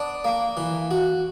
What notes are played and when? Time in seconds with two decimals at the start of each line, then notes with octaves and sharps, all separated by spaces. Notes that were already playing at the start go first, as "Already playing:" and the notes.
Already playing: B3 D4
0.25 A#3
0.57 E3
0.91 F#4